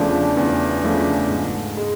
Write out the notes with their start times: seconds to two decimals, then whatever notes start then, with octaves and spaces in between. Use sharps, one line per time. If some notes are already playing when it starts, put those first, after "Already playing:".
Already playing: E2 C#3 F3 A3 D4
0.37 E2
0.83 C#3 F3 A3 D4
1.30 G#2
1.77 G#3